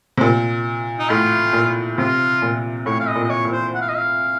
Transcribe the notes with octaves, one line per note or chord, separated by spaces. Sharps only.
C3
A#2
D#4
A2 F4
A#2
C3 F4
A#2
A2 C#5
F5
D#5
A#2
D#5
C#5
A#2
C5
F#5
F5
D#5
F5